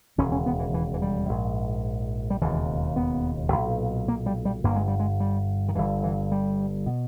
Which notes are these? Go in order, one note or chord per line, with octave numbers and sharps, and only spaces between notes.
E1 D#2 C#3 C#4
C#4
B3
E3
E3
E3
G3
A#1 G#2
G3
E1 D#2 C#3 E3
B3
B1 A#2
A#3
G3
G3
G1 G2 A#3
G#3
G3
G#3
G3
D#3
G1 G2 E3
E3
G3
B2